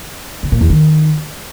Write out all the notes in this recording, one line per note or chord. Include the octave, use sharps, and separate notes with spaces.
C#3
A#2
E2
D#3